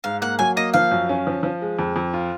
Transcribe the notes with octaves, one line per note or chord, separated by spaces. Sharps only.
G#2 F5
A#3 F#5
F#3 G#5
A#3 D#5
F3 F5
F#2
C#4
F3
F3
G#3
F2
F2
F4